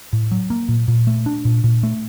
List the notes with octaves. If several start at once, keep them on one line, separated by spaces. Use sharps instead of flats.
A2
F#3
A#3
A#2
A#2
A3
D4
A#2
A#2
A3